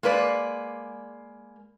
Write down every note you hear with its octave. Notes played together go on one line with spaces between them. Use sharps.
G#3 A#3 B4 D5